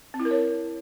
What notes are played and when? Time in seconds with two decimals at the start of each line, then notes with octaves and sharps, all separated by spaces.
0.14 C4
0.20 E4
0.25 A#4
0.31 C#5